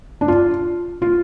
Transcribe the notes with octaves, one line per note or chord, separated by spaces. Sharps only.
D4
F4
F4